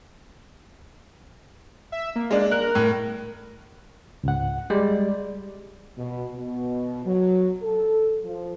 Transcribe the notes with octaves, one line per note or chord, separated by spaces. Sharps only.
E5
A#3
G#3 D4
A#4 F#6
A2
C#2 G#2 F#5
G3 G#3 D5
B2
B2
F#3
A4
F3